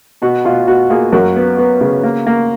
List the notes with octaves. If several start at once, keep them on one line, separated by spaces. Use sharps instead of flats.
B2 F#4
B2 F4
B2 F#4
A#3 F4 G#4
F#2 F#4 A#4
B3
B3
C#3
A#3
A#3